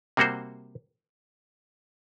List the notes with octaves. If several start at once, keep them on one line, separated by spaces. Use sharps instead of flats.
C3 G3 A#3 F#4 C5